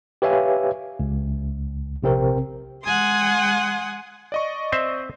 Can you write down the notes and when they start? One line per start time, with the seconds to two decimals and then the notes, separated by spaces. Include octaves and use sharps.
0.22 G4 B4 C#5 E5 F5 G#5
1.00 C#2
2.03 A#1 C3 C4 A#4
2.85 G#3 F#5 G#5 C6 D#6
4.32 D5 D#5 C#6
4.72 C4 C5 E5